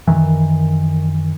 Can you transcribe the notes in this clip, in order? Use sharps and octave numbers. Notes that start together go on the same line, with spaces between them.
F#2 D#3 E3